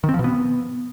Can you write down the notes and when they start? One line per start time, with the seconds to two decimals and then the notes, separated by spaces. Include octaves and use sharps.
0.04 D#3
0.09 C4
0.14 F3
0.19 B2
0.24 B3